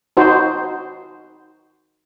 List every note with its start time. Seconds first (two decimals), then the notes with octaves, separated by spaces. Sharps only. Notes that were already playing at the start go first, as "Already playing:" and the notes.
0.17 D#4 F#4 C5